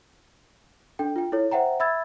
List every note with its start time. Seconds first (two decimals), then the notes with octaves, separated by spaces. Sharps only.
0.99 D4 A4 G5
1.16 F4 G5
1.32 E4 A4 C#5
1.52 C5 E5 F#5 G5 A#5
1.80 E5 B5 E6 G#6 A6